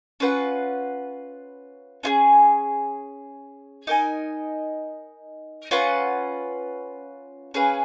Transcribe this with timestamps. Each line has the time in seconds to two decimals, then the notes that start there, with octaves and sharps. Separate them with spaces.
0.20 C#4 F4 B4 F#5
2.03 C#4 F4 G#4
3.87 D#4 A#4 D#5 G#5
5.71 C#4 F4 B4 F#5
7.54 C#4 G#4 B4 F5